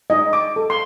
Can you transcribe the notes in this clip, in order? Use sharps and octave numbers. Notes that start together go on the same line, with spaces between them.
D#4 D#5
D6
A4
C6